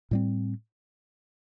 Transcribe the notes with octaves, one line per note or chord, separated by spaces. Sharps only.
A2 G3 C4